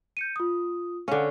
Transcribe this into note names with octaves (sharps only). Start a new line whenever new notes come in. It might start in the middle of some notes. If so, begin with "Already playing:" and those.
G6 C#7 D#7
F4 D#6
D3 C#4 F5